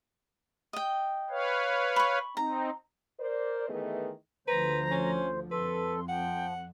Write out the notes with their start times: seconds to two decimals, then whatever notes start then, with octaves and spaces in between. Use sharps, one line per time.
0.73 D#5 G5
1.30 B4 C#5 F5
1.96 B5 C#6
2.37 C4 D#4 A#5
3.20 A#4 C5 D5
3.69 D#3 E3 A3 B3 G#4 D#5
4.48 D2 D3 F3 B4 C5 A#5
4.91 C#4
5.51 F2 A4 B4 C6
6.08 F3 F#5 G5